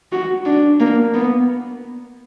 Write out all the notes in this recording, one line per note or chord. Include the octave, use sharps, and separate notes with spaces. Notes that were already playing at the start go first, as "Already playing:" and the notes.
F#4
D4
A#3
B3